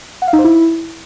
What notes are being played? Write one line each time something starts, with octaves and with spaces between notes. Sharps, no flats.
F#5
F5
D#4
C5
E4